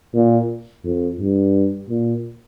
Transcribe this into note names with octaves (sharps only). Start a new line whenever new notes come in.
A#2
F2
G2
A#2